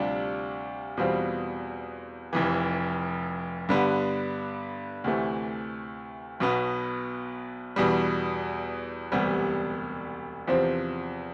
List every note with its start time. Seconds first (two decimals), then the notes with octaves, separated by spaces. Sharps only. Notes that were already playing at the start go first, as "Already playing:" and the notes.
Already playing: D2 C3 G3 D4 F4
0.97 E2 B2 G3 C4 F4
2.33 F1 F2 E3
3.69 G2 D3 G3 B3
5.04 D2 C3 E3 A3
6.40 B1 B2 B3
7.76 E2 B2 G3
9.12 E1 D2 C3 G3 B3
10.47 E2 C3 F3 C4